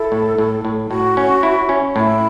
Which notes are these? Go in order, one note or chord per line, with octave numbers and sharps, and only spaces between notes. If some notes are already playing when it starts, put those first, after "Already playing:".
Already playing: E4 A4
A2
A2
A2
A2 F#4
C#4
E4
C#4
A2 E4